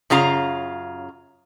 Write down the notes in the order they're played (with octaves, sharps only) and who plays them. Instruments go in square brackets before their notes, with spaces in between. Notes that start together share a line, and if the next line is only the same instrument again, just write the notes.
[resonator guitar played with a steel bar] F#2 C#3 F4 F5 A#5